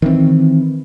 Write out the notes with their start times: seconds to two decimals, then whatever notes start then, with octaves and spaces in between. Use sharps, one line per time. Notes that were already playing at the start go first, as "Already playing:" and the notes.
0.02 D#3 E3 C4